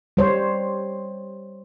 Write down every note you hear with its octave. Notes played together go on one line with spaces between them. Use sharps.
G3 C5 C#5